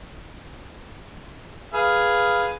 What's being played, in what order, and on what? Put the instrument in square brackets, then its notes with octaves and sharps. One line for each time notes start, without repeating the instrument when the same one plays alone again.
[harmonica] G#4 B4 F5